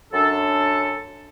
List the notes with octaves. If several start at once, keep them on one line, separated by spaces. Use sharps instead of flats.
F#2 D4 A4